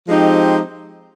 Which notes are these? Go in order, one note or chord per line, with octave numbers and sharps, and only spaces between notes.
F3 G#3 C4 D#4 G4